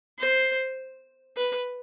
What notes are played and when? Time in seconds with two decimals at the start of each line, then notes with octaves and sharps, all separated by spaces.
0.18 C5
1.37 B4